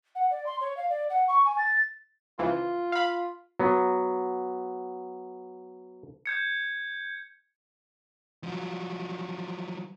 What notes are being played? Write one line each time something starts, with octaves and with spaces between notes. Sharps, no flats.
F#5
D5
C6
C#5
F5
D5
F#5
C#6
G#5
A6
C#2 E3 F3 F4
F5 B5
F#3 B3
G6 G#6 C#7
F3 F#3